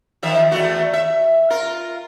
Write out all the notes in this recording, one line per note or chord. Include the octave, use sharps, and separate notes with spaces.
D#3 F3 E5
E2 A3 F#4
E5
F4 A#4